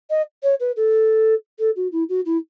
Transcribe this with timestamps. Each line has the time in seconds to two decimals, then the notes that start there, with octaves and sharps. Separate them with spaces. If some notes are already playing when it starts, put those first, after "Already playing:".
0.10 D#5
0.43 C#5
0.60 B4
0.76 A4
1.59 A4
1.76 F#4
1.92 E4
2.09 F#4
2.25 E4